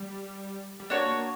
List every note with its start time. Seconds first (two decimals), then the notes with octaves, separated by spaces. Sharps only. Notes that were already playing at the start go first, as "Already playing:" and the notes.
Already playing: G3
0.80 G3
0.90 A#3 D4 F#4 C#5
1.08 A#3